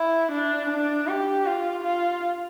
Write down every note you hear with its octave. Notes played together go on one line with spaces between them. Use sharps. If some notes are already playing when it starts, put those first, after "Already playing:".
Already playing: E4
D4
D4
G4
F4
F4